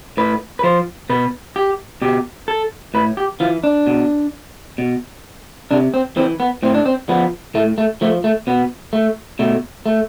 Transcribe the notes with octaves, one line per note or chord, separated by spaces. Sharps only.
A2 B4
B4
F3 C5
B2 B4
G4
B2 G4
A4
A2 B4
G4
E3 F4
D4
B2
B2
C3 D4
C4
E3 C4
B3
A2 C4
D4
C4
F3 B3
A2 A3
A3
F3 A3
A3
B2 B3
A3
B2 A3
A3